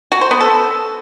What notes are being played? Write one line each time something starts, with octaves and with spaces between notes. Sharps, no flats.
F#4
C5
B3
A4